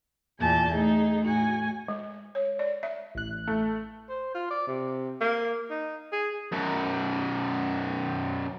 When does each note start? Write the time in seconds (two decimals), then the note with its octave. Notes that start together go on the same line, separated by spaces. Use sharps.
0.39 E2 A#2 G#5 A5 G6
0.73 A3 D#4 G#4
1.26 A2 F#4 G#5
1.88 G#3
2.35 C#5
2.59 D5
2.83 E5
3.15 A1 F#6
3.47 A3
4.09 C5
4.35 F4
4.50 D5
4.68 C3
5.21 A#3
5.70 D#4
6.12 G#4
6.52 F#2 B2